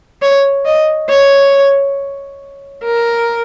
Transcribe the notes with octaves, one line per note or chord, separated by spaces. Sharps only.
C#5
D#5
C#5
A#4